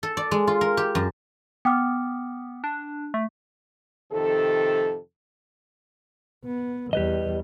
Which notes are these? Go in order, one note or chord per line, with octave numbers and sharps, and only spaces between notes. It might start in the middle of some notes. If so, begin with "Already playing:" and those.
A4
D5
G#3
F4
A#4
G4
F#2
B3 G5 D6 F6
D4
A3
F2 C3 D#3 A4
B3
E2 G3 G4 B4 D#5